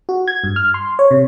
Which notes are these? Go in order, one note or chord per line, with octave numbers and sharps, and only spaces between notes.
F#4
G#6
G2
F6
C6
C#5
C3